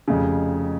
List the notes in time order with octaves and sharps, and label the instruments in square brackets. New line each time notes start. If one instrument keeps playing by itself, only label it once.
[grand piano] F1 F2 C#3